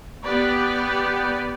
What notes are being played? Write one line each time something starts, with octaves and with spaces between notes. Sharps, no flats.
B3 G4 B4 D5